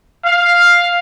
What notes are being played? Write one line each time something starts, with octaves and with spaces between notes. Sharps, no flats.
F5